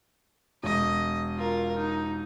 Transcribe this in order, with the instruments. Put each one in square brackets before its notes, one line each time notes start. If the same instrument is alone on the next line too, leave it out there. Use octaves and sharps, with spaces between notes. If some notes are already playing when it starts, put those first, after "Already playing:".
[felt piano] E1 [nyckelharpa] D#5
[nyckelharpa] F4 A#4
D#4